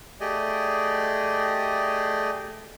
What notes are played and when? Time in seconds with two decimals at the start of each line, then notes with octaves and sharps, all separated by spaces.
0.20 A3 G4 G#4 D5 D#5